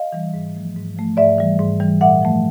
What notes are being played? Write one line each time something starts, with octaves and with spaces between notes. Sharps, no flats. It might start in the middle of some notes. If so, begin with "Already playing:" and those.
Already playing: D#5 F5
E3 G3
G#2
F3 A3
G#2
F3 A3
G#2 D5 E5
E3 G3
G#2
E3 G3
A#2 E5 F#5
F3 A3